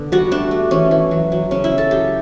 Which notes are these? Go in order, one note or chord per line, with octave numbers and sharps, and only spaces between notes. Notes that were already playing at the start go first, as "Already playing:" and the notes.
Already playing: D3 B3
G3 F#4
A3 D4
A3
E3 C#4
E3
F#3
F#3
C#3 C#4
E4
C#3
A4
F#3 G4